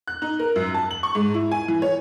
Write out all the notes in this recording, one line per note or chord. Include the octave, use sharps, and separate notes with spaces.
F#6
D#4
A#4
F#2
A5
F#7
C#6
G#2
E4
G#5
E3
C#5